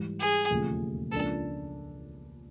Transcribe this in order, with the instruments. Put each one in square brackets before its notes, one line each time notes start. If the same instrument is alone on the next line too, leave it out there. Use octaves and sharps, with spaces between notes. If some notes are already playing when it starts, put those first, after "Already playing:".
Already playing: [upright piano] G#2 E3 G3
[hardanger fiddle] G#4
[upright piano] E1 D#2 C#3 F3 A3
[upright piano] C#2 C#3 F3 A#3 D4 [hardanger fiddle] A4